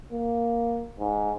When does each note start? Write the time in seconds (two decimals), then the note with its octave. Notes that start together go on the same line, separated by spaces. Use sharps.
0.12 A#3
0.99 G#2